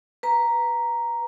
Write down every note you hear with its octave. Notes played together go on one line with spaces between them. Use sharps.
B4 A#5